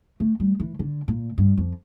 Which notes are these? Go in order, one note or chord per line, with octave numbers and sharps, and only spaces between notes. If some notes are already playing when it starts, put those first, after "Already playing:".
A3
G3
E3
D3
A#2
G2
F2